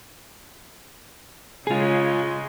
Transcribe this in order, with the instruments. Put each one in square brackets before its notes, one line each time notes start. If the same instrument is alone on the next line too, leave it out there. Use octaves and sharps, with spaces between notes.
[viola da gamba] C#3 G#3 [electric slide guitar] F4 G#4